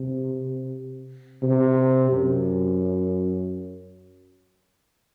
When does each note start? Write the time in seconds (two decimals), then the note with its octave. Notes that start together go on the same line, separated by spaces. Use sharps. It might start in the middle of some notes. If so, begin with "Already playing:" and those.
Already playing: C3
1.43 C3
2.12 F#2